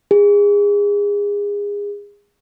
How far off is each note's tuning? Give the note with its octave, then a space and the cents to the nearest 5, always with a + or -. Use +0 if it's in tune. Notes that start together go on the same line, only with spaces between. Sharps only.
G#4 -25